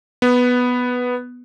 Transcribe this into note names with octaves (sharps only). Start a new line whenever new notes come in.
B3